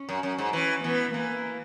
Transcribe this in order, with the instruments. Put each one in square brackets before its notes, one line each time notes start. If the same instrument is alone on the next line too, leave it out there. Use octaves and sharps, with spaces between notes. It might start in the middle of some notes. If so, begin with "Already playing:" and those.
Already playing: [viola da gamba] C#4
[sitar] F#2
F#2
G#2
[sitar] E3 [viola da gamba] C#4
[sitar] E3 [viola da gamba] B3
[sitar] E3 [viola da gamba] A#3